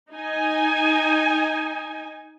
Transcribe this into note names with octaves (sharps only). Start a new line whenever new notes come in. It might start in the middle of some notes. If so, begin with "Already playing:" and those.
D#4 G#5